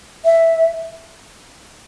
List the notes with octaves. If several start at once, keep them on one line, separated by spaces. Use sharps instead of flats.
E5